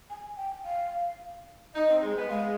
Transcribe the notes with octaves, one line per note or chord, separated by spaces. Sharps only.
G#5
G5
F5
D#4 D#5
C4
G#3
B3
G#3 F5